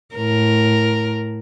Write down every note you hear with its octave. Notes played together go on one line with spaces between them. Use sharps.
A2 A#4